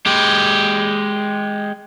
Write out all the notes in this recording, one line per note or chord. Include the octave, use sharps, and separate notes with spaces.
G#3 G4